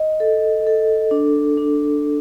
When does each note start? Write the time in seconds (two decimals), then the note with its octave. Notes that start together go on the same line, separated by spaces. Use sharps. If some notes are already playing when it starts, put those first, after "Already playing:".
Already playing: D#5
0.20 A4
0.67 A4
1.11 D4
1.58 D4